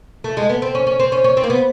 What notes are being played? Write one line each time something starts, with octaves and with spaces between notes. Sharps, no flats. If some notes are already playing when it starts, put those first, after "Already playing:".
A3
G#3
B3
C4
C#4
C#4
C4
C#4
C#4
C4
A#3
B3